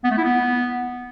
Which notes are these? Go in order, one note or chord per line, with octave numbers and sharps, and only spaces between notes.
B3
A3
E4
B3